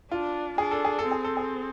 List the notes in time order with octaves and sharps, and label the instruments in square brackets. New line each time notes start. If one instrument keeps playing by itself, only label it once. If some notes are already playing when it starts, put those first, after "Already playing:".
[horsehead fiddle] D4 [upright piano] F4
[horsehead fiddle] D4 [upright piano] G#4
[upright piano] A4
G#4
A4
[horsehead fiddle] C4
[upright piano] G#4
A4
G#4